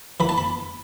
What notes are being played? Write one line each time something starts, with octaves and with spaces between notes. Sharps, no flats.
E3 B5
A5
B5